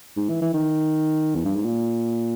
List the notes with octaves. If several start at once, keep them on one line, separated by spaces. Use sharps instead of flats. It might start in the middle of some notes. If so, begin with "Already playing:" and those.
G#2
E3
E3
D#3
E2
G2
G#2
A#2